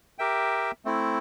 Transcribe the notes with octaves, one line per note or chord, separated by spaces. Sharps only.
G4 A#4 E5 G5
A3 C4 E4